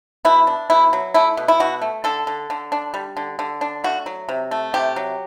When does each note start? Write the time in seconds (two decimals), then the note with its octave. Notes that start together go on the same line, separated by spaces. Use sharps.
0.25 B2 E4
0.47 D4
0.70 B2 E4
0.93 F#3
1.14 A3 E4
1.37 B2
1.48 E4
1.60 B2 F#4
1.82 A3
2.04 D3 A4
2.27 D3
2.50 D3
2.72 D4
2.94 G3
3.17 D3
3.39 D3
3.61 D4
3.84 A3 F#4
4.06 F#3
4.29 C3
4.51 A3
4.74 C3 G4
4.96 F#3